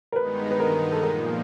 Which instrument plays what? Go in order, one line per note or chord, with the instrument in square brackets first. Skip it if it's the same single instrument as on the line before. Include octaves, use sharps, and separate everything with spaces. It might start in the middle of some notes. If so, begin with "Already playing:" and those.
[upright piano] A#4
[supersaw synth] G2 D#3 G#3 B3 D#4 [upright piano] B4
[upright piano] B4
A#4
A4
[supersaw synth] A#2 F3 A#3 [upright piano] A#4